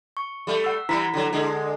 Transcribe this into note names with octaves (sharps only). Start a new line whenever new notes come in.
C#6
G3 A3
F#5 E6
E3 G3 E4 A#5 B6
D3 F#3
D3 G#3